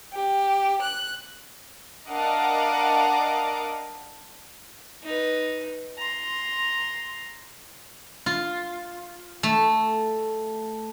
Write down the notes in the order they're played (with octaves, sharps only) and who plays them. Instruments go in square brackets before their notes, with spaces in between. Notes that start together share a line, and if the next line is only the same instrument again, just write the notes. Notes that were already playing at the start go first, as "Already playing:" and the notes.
[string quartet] G4
F#6
[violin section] D4 A#4 D#5 F5 F#5 D6
[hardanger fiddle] D#4 B4
A#5 C6
[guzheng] F4
A3